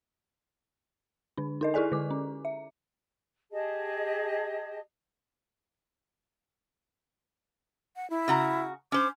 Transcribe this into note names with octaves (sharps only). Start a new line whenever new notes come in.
D3 D4
D#4 A#4 D#5
E4 G#4 A4 D5 G#5
D3 D6
C#4
E5
G4 G#4 D#5 A5
F#5
E4
C#3 F#4 A#5
C#4 C5 D6